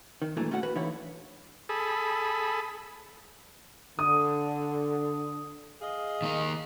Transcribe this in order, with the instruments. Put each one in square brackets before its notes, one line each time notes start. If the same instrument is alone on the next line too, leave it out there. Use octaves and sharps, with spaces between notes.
[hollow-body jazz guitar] D#3
G2 A#2 E3 F#3 A3 D4
A3 C#4 F#4 F5 F#5
F#4 B4
D3 E3 D#4 E4 C#5 F5
[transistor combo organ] G#4 A4 B5
[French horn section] D3 [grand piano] D#6
[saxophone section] G#4 D#5 F5
[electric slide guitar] D#3 A#3 D#4